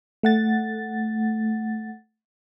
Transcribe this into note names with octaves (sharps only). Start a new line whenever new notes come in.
A3 F#5 A6